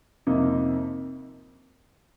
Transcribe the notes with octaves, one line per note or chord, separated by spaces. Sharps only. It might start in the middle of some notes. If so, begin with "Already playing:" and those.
F2 C3 F3 A#3 D#4